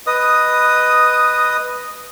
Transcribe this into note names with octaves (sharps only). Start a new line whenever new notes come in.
B4 D#5 D#6